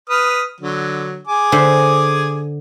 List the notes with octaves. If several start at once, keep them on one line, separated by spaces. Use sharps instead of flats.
B4 D#6 F6
D3 F#3
G#4 G#5 D6
D3 C5 E5